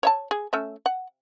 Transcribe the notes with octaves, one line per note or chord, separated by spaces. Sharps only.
C#5 E5 A5
G#4
A3 C#4 E5
F#5